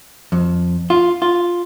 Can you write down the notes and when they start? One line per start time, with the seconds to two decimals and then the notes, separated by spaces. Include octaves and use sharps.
0.32 F2
0.90 F4
1.22 F4